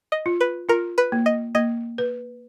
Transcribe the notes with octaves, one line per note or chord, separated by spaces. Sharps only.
D#5
F4
B4
F4 A#4
B4
A#3
D#5
A#3 D#5
B4